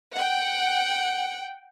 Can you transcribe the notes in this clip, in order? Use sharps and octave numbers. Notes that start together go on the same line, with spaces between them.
F#5 G5